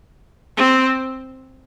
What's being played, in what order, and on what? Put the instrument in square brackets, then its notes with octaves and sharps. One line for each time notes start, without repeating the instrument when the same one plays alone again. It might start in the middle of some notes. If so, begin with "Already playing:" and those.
[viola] C4